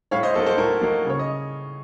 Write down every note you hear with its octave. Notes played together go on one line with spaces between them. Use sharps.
A2 C#5 F5
C5 D#5
F#3 A#3 D#4 A4 C5
A4 C5
A2 A#4
F#3 A#3 D#4
C#3 C#5
D#5